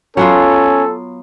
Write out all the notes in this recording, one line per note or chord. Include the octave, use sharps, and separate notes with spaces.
F#3 B3 C#4 F4 A4